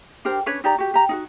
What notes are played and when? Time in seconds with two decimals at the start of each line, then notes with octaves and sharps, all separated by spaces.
0.25 D4 G4 A#4 C5
0.46 C#4 D4 B4 C#5
0.64 D#4 G4 D5 A#5
0.78 F#4 G4
0.94 G4 A#5
1.09 D#4 F4 F#4